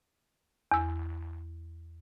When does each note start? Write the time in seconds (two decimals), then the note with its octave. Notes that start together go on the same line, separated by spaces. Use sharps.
0.72 E2 E6